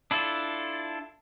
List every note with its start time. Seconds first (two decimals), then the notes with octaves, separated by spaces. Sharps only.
0.11 D4 E4 F4 A4